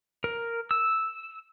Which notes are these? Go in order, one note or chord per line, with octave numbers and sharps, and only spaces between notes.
A#4
E6